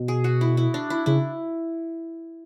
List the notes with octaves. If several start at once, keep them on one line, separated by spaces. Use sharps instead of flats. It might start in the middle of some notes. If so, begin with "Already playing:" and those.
Already playing: B2
G#4
F#4
E4
E4
D4
E4
C#3 E4